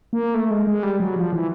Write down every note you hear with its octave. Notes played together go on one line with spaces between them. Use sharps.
A#3
A3
G#3
G#3
G3
F#3
F3
E3